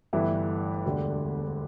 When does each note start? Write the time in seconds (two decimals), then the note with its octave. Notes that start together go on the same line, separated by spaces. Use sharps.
0.13 G1 G2 E3 A3 E4
0.85 E1 D2 D3 G3 D4